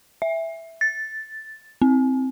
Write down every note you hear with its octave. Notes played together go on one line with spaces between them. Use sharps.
E5
A6
C4